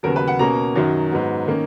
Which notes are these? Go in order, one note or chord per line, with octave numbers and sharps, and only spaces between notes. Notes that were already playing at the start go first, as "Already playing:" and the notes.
D#2 C#3 F#3 B3 A#4
B4
F#5
B2 A#3 C#4 A#5
F#2 D#3 F#3
G#2 F#3 B3
D#3 A#3 C#4